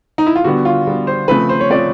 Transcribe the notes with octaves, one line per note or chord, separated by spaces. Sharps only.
D#4
E4
F4
D3 G3 B3 F#4
F4
D3 G3 B3
C5
C#3 F3 A3 C4 B4
C5
C#5
C#3 F3 A3 C4 D5